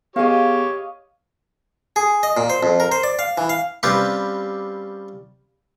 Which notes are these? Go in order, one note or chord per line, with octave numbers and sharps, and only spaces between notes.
B3 G4 G#4 C#5 D#5 F5
G#4
D#5
A#2
C5
F2
A#4
C5
D5
F5
E3
F5
G3 C4 C#4 F4 G4 B4